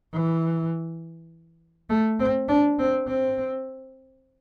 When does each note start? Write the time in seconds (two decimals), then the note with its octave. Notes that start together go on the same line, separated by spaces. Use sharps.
0.13 E3
1.90 A3
2.20 C4
2.48 D4
2.79 C4
3.07 C4